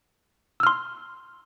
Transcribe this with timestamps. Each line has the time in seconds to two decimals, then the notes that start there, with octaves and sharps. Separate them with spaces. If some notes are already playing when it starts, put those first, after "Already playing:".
0.60 E6
0.63 F6
0.67 C6